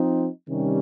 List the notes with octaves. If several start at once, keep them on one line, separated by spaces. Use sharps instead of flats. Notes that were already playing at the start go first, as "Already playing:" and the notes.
Already playing: F3 C4 D#4
C3 D#3 G3 C#4